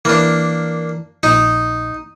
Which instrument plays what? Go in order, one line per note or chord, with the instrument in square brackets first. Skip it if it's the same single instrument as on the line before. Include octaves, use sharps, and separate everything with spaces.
[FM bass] E3 [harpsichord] A#3 D4
[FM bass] A#1 [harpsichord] D#4